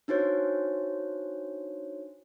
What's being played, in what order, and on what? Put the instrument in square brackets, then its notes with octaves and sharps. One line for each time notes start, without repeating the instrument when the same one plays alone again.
[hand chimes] D4 D#4 F#4 C5 C#5